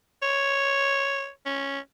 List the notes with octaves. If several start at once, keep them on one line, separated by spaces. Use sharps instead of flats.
C#5
C#4